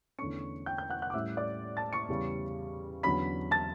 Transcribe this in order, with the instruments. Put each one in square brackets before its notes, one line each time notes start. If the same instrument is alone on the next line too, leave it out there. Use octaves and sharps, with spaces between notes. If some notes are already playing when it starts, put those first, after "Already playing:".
[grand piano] E2 D3 A3 C#4 C#6 C#7
G5 G6
G5 G6
F#5 F#6
F#5 F#6
D6
A2 G3 C#4 E5 E6
D5 D6
A5 A6
C#6 C#7
E2 C#3 G3 C#4
E2 D3 F#3 C#4 B5 B6
A5 A6